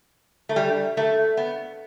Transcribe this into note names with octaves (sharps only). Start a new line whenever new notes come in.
A3
G3
A3
B3